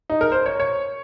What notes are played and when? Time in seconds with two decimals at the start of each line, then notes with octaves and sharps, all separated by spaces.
0.10 D#4
0.21 A#4
0.32 C5
0.46 C#5
0.60 C#5